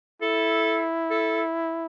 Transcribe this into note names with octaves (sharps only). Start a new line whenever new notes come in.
E4 A4
A4